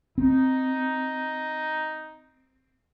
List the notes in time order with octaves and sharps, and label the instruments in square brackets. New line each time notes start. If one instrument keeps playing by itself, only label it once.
[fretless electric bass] C4 [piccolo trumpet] D#4